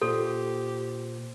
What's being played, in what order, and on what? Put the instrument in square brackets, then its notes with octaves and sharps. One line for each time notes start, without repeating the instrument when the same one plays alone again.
[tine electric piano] A#2 C5 [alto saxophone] G4 [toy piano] A4